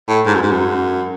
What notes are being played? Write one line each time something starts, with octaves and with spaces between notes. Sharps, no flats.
A2
G#2
F#2
G#2
F#2